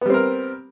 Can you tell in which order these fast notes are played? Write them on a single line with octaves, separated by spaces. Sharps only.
B3 G3 C4 A#4